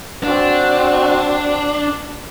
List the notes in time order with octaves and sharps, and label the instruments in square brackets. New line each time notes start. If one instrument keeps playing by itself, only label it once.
[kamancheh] C4 F#4 [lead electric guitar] D4